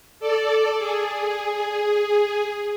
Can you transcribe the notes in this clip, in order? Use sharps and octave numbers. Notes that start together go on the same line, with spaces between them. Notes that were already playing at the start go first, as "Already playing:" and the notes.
A4 D5
G#4